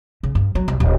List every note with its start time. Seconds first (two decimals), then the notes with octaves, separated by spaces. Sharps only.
0.23 C#3
0.35 G2
0.55 F#3
0.68 C2
0.80 D1